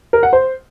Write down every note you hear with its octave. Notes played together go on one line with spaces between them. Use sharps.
A#4
F#5
C5